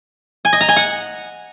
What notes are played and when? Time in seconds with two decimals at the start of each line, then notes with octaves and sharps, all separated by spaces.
0.45 G#5
0.53 D#5
0.61 A#5
0.68 G#5
0.76 F#5